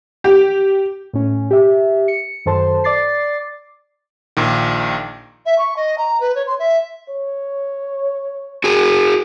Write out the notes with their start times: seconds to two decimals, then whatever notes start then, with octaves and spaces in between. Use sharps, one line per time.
0.24 G4
1.13 A2 C#4
1.51 G4 E5
2.08 C#7
2.46 F#2 D#3 A4 C5 A5 C6
2.84 D5 D6 A6 C7
4.37 A#1 A#2 D#3
5.45 E5
5.58 C#6
5.76 D#5
5.98 A#5
6.20 B4
6.35 C#5
6.47 C6
6.59 E5
7.09 C#5
8.64 F#4 G#4